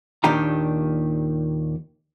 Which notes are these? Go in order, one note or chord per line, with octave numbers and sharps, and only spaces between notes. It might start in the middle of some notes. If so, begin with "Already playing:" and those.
D#2 A#2 D#3 D4 G4 A#5